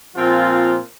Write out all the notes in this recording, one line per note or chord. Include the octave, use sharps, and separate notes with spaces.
A#2 F3 C4 F4